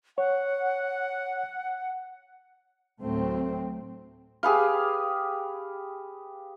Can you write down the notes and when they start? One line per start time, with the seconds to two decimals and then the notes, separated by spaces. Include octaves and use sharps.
0.18 C#5 F#5
3.01 D2 A2 F#3 A3 C4
4.43 G4 G#4 B4 F5